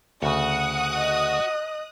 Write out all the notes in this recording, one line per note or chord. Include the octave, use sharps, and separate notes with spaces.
D2 C#3 F#4 D#6 F#6
D#5